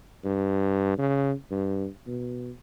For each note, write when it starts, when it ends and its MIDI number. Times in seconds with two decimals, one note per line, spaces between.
0.24 0.96 43
0.98 1.33 49
1.51 1.87 43
2.07 2.51 47